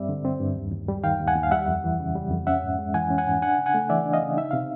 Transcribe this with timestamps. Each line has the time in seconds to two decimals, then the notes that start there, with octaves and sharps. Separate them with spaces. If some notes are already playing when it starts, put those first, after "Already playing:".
Already playing: G2 G3 C4 D5 E5
0.09 D3
0.25 C4
0.40 G2
0.56 D#2
0.72 D#2
0.88 G3
1.04 D#3 F5 G5
1.20 D#2
1.28 F#5 G#5
1.35 D#2
1.43 F5
1.51 G3 E5 F#5
1.68 F2
1.84 E3
2.00 C#3
2.15 G3
2.31 F2
2.47 C#4 E5 F#5
2.63 G#2
2.79 G#3
2.94 E3 F#5 G#5
3.10 C#4
3.18 F#5 G#5
3.26 G#2
3.42 D4 F#5 G#5
3.58 C#3
3.66 F#5 G#5
3.74 A3
3.89 E3 D5 E5
4.06 D4
4.13 D#5 F5
4.22 C#3
4.37 D#4 E5
4.51 C3 F5